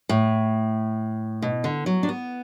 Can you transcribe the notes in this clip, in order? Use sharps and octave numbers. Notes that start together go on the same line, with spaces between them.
A2
B2
D3
F#3
D4
B3